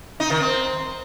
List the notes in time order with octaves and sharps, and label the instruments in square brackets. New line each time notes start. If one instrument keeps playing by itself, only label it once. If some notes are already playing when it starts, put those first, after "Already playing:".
[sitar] D#4
D#3
C4